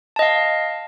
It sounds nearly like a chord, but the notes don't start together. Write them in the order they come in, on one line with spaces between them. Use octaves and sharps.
A5 D#5 F5